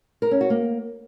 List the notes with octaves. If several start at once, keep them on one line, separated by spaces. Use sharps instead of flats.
A#4
C#4
F#4
A#3